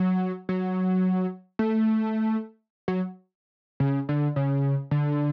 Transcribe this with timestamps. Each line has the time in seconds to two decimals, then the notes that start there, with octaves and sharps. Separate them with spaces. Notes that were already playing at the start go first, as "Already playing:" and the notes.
Already playing: F#3
0.49 F#3
1.59 A3
2.88 F#3
3.80 C#3
4.09 D3
4.36 C#3
4.91 D3